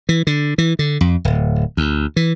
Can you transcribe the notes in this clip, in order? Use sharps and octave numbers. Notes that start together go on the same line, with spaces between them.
E3
D3
E3
D3
F2
D1
D2
E3